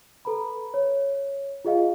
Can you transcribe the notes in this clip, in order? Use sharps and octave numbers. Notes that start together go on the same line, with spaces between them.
A4 B4 A#5 B5
C#5
F4 G#4 D#5 F5